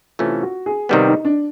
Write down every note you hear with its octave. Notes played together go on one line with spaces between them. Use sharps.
C3 E3 A3 C#4 F4
F#4
G#4
C3 D#3 G3 B3 G4
D#4
D4